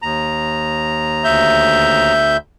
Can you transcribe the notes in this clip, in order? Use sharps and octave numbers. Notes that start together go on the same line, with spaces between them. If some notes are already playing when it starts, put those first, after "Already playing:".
D#2 A#5
D2 E5 G6